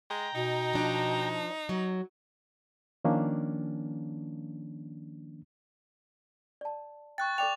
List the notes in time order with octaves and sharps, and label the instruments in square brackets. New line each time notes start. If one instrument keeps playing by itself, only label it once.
[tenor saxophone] G#3 [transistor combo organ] G5 A#5
[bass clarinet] B2 [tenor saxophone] D#4
[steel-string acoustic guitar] F3 D4
F#3
[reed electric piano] D#3 F3 A#3 C#4 D4
[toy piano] D5 A5
[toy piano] G5 [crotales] C#6 F#6 A6
[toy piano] A4 D5 G5 [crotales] D6 F7